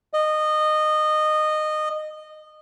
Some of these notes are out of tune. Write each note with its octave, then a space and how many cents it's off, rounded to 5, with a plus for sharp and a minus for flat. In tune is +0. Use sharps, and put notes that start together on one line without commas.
D#5 -20